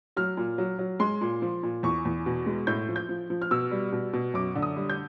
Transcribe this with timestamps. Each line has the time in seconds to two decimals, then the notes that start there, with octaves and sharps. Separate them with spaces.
0.16 F#3 F6
0.37 A#2
0.58 F#3
0.79 F#3
1.00 G#3 C6
1.21 A#2
1.42 F3
1.63 A#2
1.83 E2 C#6
2.05 E2
2.26 B2
2.46 G#3
2.67 A2 G6
2.89 F3
2.96 G6
3.09 F3
3.30 F3
3.42 F6
3.51 B2 E6
3.71 G3
3.92 B2
4.13 B2
4.34 F#2 D6
4.55 D3
4.62 D#6
4.76 G3
4.90 G6